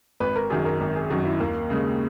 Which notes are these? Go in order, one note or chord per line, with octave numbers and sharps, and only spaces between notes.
G#1 B4
A#4
F#2 D#3 F#3 G#4
A#4
G#1 A#4
G#4
F#2 D#3 F#3 F#4
E4
D#2 A#3
C#3 G#3